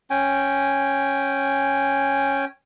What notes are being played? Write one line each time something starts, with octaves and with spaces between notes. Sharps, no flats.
C#4 G5 G#5